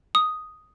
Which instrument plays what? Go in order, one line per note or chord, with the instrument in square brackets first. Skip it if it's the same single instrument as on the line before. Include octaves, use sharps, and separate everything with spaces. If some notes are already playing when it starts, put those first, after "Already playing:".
[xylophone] D#6